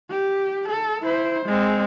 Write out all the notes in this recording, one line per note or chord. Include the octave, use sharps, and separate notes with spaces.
G4
A4
E4 C5
G#3 C4